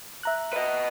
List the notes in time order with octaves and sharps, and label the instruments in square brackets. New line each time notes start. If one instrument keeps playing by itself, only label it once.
[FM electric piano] E5 A#5 F#6
[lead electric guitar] B4 D#5